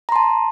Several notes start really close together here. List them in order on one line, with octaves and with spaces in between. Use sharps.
A#5 C6 A5